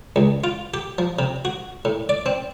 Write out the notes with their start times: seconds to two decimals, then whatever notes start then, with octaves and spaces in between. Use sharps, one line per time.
0.16 C#2
0.44 F4
0.74 G4
0.98 F3
1.19 C3
1.45 F#4
1.85 A2
2.09 D5
2.26 C4